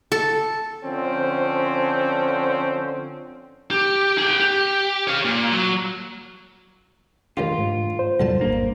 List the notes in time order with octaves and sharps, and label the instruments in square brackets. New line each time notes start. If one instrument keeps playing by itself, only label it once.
[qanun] A4
[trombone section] D3 F3 C4 C#4
[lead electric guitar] G4
G#4 G5
G4
C#5 F5
A#2
F#3
[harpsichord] A#1 D#3 G4 [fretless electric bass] A3 D4 [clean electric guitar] F4
[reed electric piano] G#2
C5
[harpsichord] B1 D3 A5 [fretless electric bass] E2 A2 G3
[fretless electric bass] G#1 D4 [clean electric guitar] A#3